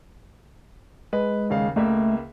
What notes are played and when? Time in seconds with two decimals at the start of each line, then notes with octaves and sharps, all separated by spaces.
1.13 G#3 B4
1.50 D#2 C#3 F5
1.76 C#2 A3 A#3 E5